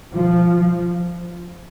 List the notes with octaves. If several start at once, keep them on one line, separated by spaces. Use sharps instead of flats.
F3